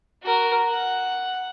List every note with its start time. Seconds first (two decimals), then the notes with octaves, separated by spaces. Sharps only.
0.23 F#4 A#4
0.69 F#5